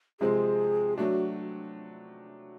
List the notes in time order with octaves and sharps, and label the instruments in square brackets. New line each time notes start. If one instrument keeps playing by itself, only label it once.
[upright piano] C3 F3 G#3 C4 [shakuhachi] G#4
[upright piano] F#3 A3 D4 [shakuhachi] F#4